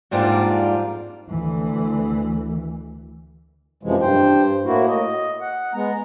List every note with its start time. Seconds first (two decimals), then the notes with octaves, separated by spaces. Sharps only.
0.11 F2 G#2 G3 A#3 D4 F4
1.29 D2 E3
3.83 F#2 C3 E3 F3 G#3
4.01 G2 C5 G5
4.65 A2 A#3 E4 F#4
4.87 D#5
5.40 F#5
5.74 G#3 B3 A#5